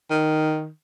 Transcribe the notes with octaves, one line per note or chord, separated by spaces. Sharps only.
D#3